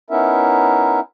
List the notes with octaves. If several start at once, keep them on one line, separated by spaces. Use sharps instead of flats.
B3 C#4 D#4 E4 A#4 E5